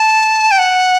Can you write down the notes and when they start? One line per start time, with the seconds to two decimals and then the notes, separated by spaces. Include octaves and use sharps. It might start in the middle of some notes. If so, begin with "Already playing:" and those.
Already playing: A5
0.51 G5
0.58 F#5